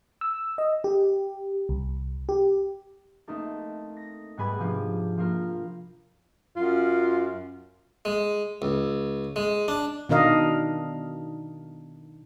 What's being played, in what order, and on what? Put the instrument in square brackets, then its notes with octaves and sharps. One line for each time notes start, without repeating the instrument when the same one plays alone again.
[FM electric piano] E6
D#5
G4
C2
G4
[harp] A3 A#3 C4 D#4 A4
A#6
G#2 G3 B3 G#5 B5 G#6
C3 F3 D4
F3 A#3 F4 A#4
[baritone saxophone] F#2 [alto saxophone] F4
[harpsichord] G#3
C#2
G#3
D4
[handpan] B2 D#3 D4 A#4 D#5 F5